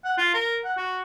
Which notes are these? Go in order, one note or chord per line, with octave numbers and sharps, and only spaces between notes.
F#5
F4
A#4
F#5
F#4